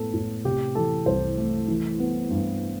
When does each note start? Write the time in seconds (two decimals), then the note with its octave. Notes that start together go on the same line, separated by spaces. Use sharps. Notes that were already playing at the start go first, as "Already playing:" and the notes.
Already playing: A2 B3 A4
0.14 A2
0.45 C3 G4
0.75 E3 A4
1.06 C2 C5
1.38 A3
1.68 E3
2.00 B3
2.30 G2